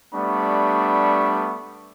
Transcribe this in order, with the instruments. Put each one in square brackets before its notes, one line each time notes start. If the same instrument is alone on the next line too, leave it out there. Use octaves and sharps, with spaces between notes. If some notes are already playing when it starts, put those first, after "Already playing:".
[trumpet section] G3 A3 B3 D4 B5 C#6